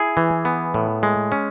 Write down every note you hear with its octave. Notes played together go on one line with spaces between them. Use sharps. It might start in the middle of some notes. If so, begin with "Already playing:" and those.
Already playing: E4 G#4
E3
B3
A2
G#3
C#4